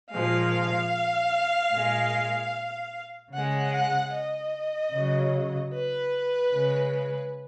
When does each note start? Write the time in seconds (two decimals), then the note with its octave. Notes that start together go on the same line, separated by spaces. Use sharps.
0.11 A#2 F3 G#3 F5
1.72 A#2 G#3
3.33 C#3 G#3 F#5
3.72 F#5
4.13 D#5
4.93 C#3 F#3
5.72 B4
6.52 C#3 G#3